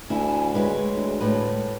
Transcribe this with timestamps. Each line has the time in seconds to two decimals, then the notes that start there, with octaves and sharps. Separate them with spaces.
0.10 D2 E4 G#5
0.54 G#3 E4 B4 C#5
0.96 D2
1.21 A2 B4